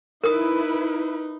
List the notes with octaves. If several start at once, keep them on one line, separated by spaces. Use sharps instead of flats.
D#4 E4 A#4 B4 D#6